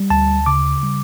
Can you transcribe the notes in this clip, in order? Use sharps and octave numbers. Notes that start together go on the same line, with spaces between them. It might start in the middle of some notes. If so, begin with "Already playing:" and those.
Already playing: G3
D2 A5
C#3 D6
G3